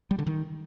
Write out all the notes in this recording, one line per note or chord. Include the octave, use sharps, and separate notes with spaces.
G3
D3
D#3